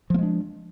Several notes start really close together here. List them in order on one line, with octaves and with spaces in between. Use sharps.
F3 A#3 G#3 D4